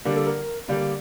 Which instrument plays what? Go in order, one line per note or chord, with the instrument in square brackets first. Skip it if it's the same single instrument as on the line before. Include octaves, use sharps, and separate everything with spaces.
[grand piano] D3 G3 A#3 D4 [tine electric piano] A#4
[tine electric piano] A4
A#4
[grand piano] D3 G3 A#3 D4